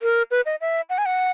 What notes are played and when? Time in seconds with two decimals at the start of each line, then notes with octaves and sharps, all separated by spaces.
0.02 A#4
0.31 B4
0.46 D#5
0.61 E5
0.90 F#5
0.98 G#5
1.06 F#5